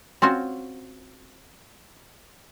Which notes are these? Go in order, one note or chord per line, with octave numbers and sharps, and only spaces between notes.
C4 C#4 F4 F#4